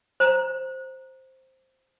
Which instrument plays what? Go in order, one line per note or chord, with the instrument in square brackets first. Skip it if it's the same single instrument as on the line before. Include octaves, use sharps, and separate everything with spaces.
[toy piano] C5 A#5